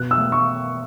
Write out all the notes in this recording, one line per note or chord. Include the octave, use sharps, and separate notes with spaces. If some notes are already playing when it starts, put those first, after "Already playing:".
Already playing: B2 B3 F#6
E6
A3
C#6